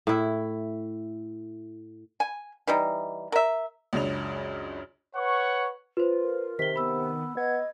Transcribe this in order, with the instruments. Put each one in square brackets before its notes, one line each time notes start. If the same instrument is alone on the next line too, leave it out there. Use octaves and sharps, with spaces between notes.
[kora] A2 E4
[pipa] G#5
E3 G3 D#4
A#4 E5
[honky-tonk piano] C#2 F#2 C#3 D4 F7
[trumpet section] B4 C#5 F#5 C#6
[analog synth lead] F4 [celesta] B4 C5
[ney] A#4
[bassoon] C3 [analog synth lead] D#3 [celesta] B6 G7
[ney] B3 [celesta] B5 E6
[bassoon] B3 [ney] D#5 [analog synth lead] G#6